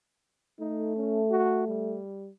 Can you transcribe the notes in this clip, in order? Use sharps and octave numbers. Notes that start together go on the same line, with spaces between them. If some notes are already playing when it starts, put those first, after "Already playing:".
A3 D#4
C#4
F#4
G3